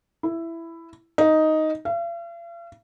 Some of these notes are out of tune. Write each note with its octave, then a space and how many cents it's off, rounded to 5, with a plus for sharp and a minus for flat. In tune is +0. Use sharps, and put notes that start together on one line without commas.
E4 +10
D#4 +5
F5 -45